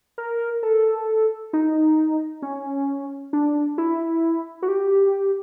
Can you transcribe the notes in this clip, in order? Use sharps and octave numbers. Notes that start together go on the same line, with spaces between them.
A#4
A4
D#4
C#4
D4
E4
F#4
G4